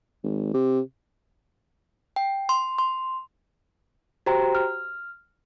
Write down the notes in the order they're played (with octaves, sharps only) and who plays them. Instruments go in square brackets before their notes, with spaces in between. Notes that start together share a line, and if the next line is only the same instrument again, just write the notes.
[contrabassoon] G#1
C3
[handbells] G5
C6
C6
[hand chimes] F#4 G4 C5 G5 A#5
F6